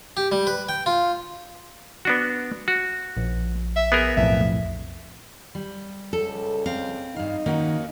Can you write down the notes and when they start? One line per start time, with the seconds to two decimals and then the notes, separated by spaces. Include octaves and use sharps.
0.17 G4
0.32 G3
0.47 B4
0.69 G5
0.86 F4
2.05 B3 D4 F#4
2.68 F#4
3.17 A#1
3.76 E5
3.92 B3 G#4 A#4
4.16 B1 F2 A2 E5
5.55 G3
6.13 C#2 A4
6.66 C4 F5
7.16 G2 D#4 F5
7.46 D#3 A#3 C#4 F#4